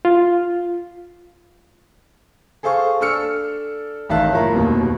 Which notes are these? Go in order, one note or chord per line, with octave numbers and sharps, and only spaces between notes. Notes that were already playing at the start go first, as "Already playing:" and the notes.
F4
G#4 A4 C5 F5 C#6
D4 A4 E6 F6 C#7
A1 D#3 E5 F5 A5 F#6
F#1 A2 F4 A#4
F1 D#2 B2